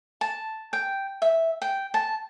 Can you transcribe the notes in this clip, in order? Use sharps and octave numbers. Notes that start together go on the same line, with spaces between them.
A5
G5
E5
G5
A5